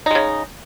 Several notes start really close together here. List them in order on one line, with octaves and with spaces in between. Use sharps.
D#4 G#3 C#3